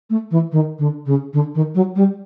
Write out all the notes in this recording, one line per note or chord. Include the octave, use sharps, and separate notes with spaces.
A3
E3
D#3
D3
C#3
D3
D#3
F#3
G3